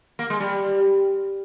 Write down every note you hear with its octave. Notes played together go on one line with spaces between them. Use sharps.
A#3
G#3
G3